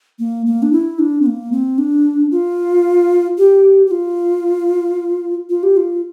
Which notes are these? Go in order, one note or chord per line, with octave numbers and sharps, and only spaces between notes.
A#3
A#3
D4
E4
D4
C4
A#3
C4
D4
F4
G4
G4
F4
F4
G4
F4